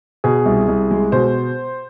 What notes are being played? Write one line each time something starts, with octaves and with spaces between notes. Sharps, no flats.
B2 G#4
C2
C2
G#3
B2 C5